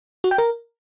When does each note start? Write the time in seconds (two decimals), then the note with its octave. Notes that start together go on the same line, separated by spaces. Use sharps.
0.24 F#4
0.31 G5
0.38 A#4